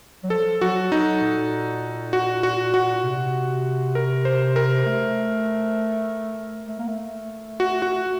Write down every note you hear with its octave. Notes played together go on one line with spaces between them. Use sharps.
F#3
F3 A4
F#3 F#4
F#3 D#4
A#2
F#4
F#4
F#4
C3
A#4
C5
A#4
A3
A3
A#3
A3
F#4
F#4